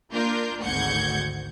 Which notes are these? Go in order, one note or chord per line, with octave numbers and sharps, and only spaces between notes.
A#3 D4 F4 A#4 G6
G#1 D2 F#5 G6 G#6 C#7